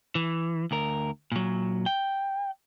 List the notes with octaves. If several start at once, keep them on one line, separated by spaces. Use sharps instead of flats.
E3
D2 A#4
A#2 F#3
G5